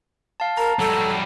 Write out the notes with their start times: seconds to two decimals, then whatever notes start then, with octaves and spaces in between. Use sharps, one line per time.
0.40 F5 A5
0.57 A#4 A5 A#5
0.79 F#3 G3 A4